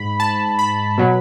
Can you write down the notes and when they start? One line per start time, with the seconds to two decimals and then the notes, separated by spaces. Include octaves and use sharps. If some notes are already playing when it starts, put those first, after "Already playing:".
Already playing: G#2 B5
0.20 A5
0.59 B5
0.98 B2 F#3